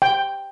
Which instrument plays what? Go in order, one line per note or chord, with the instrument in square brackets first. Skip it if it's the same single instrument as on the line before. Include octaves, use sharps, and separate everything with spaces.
[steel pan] G5